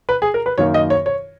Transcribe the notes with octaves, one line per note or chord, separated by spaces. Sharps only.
B4
G#4
A#4
B4
F#2 D#3 A#3 C#5
D#5
C#5
C#5